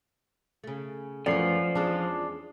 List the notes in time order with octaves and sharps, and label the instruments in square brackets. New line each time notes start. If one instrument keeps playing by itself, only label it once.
[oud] C#3 A3
[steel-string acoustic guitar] F#2 [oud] E3 A3 [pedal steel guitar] F3 [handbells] D5 C7
[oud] E2 G#3 C#4 [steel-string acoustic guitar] D4